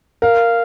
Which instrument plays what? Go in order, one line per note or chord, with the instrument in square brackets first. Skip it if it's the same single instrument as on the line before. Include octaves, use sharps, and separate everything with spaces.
[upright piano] A#4 [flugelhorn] F5